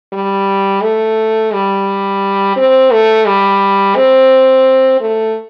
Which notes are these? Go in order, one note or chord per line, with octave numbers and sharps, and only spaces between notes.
G3
A3
G3
C4
A3
G3
C4
A3